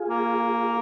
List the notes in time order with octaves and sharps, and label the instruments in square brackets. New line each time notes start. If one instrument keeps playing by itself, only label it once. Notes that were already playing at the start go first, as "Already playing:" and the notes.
Already playing: [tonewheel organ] F4 G#4
[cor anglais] A#3